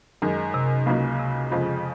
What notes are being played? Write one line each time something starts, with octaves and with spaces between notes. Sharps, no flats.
F#2 D#3 G#3
C3
C#2 C#3 F#3 A#3 D#4
C3
F2 C#3 F3 G#3